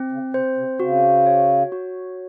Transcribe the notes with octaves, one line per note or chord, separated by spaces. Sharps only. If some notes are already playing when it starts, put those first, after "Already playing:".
Already playing: C4
C#3
C3 C5
C3
C#3 F#4
C#5
F#4